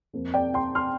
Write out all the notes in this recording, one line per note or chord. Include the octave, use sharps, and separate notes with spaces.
F2 F3 A#3
D5 G5
G5 C6
C6 F6